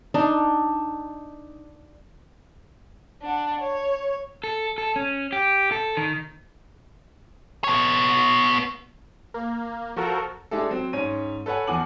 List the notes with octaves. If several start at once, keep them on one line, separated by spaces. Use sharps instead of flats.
D4 D#4
D4 F#5
C#5
A4
A4
C#4
G4
A4
D#3
B3 C#5
A#3
F3 F#4 A4 A#4
G#3 D4 E4 G4 A4
F#3 C4
G#2 C#4 C#5 D#7
A4 B4 C#5 F#5 G#5
E2 F3 F#5 G#5 D6 F#7